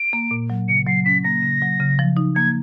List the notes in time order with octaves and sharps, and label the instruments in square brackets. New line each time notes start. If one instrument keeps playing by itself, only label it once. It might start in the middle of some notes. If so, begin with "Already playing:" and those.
Already playing: [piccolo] D7
[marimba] A#3
A#2
F#3
[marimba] C#3 [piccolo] C#7
[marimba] F#3 [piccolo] C7
[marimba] C#4 [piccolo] B6
[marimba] A#3 [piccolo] A#6
[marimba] C#3
F#3
C#3
F3
D#4
[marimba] A#3 [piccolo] G#6